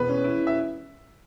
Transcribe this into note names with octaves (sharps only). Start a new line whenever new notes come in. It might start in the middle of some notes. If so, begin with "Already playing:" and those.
Already playing: E1 B3 B4
C#4
E4
E5